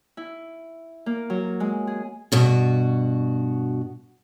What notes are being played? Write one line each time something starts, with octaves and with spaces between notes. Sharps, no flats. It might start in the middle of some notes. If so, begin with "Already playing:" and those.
E4
A#3
F#3
G#3
G#4
G2 B2 F#4